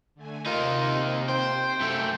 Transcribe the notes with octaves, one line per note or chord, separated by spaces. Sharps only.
D3 A3 G#5
C3 A#3 D#4 F4
C5 G5
F#2 A3